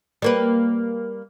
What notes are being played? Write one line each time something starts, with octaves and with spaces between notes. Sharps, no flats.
G3 A#3 B4